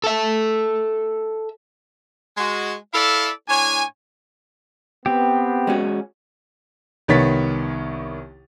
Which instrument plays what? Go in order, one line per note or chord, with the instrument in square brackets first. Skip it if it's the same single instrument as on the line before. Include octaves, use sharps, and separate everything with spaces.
[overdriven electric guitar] A4 E5
[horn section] G#3 F#4
E4 A4 D5 E5 F5
A2 D4 C#5 G#5
[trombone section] B3 [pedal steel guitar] C4 G4
[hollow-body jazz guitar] G#3 C#4 F#4
[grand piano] C2 D#3 B3 C#5 A6 B6